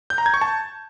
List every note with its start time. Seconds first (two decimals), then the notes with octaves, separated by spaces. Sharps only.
0.10 G6
0.18 A#5
0.26 G#6
0.34 C#6
0.41 A5